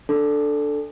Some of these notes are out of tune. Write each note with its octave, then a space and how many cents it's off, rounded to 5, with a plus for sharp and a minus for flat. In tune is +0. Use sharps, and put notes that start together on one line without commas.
D4 +0 A4 +0